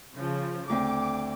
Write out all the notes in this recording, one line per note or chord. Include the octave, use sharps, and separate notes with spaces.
C#3 F3
D2 C4 D6